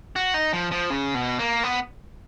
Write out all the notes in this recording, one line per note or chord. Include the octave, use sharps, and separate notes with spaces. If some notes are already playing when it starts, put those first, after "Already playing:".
F#4
D#4
F3
F3
C#3
B2
A#3
B3